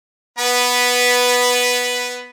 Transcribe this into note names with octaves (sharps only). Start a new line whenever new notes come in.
B3 B4